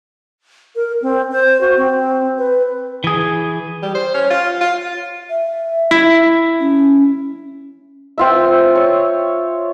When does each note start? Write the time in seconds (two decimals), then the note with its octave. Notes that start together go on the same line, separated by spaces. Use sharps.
0.76 A#4
1.02 C4
1.32 C5
1.61 F#4
1.77 C4
2.38 B4
3.04 E3 G#4
3.83 G3
3.95 C5
4.14 C#4
4.31 F4
4.61 F4
5.30 E5
5.91 E4
6.60 C#4
8.18 C4 F4 E5
8.75 C#5